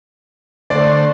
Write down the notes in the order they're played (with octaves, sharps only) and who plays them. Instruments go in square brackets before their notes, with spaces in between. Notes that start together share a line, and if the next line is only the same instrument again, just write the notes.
[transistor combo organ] D3 A3 C5 [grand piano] D5